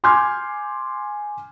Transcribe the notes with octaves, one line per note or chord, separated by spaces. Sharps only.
G#5 C6 D6 F6 G6 G#6